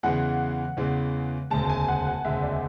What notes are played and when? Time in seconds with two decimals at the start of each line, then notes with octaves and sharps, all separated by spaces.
0.03 E2 C#3 E3 G#3 F#5
0.77 E2 C#3 E3 G#3
1.50 E1 D2 C#3 G#3 A5
1.65 A5
1.69 G#5
1.88 F#5
2.07 F#5
2.25 E1 D2 C#3 G#3 E5
2.42 D5